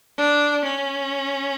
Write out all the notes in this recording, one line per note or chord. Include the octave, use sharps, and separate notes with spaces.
D4
C#4